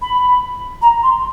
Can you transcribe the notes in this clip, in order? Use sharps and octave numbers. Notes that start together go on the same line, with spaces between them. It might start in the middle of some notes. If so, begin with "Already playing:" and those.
B5
A#5
C6